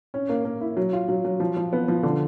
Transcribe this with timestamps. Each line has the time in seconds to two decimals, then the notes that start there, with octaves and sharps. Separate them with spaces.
0.14 C#4
0.29 A#3
0.45 A#3
0.61 E4
0.77 F#3
0.93 F4
1.09 F#3
1.24 F#3
1.40 F3
1.57 F3
1.73 B3
1.88 F3
2.03 D3